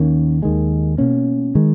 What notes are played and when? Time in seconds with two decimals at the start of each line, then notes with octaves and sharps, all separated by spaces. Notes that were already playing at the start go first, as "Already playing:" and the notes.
Already playing: D#2 D#3 A#3 C#4
0.42 D#2 D#3 G#3
0.98 B2 A#3 C#4
1.55 D#3 G#3